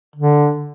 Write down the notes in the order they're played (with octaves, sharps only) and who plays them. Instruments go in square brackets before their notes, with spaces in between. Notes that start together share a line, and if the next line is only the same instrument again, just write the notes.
[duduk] D3